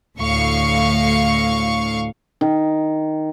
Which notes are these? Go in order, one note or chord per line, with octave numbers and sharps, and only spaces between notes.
D2 A2 F5 C#6
D#3